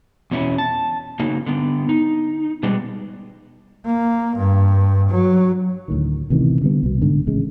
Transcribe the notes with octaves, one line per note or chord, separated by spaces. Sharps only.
E2 B2 C#4 E4
A5
C#3 F#3 A#3 D#4
D3 B3
D#4
B2 G3 G#3 B3
A#3
G2
F#3
D2 A2 D#3
A1 C3 D#3 E3
D3 G3 B3
C2 B2
G#2 D3
A1 C#3 G#3